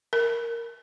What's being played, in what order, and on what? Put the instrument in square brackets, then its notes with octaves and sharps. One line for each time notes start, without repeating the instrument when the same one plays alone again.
[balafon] A#4